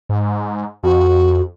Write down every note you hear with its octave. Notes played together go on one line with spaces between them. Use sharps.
G#2
F2 F#4